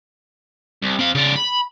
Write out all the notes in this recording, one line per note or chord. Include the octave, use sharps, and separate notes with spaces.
C2
C4 F5
C#3 D5
B5